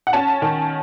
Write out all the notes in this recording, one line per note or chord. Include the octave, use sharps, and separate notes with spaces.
F#5
C#4 A5
D#3